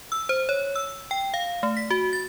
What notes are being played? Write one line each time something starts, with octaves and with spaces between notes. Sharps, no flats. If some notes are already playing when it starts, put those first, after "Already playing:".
E6
C5
C#5
E6
G5
F5
A3
B6
F#4
A6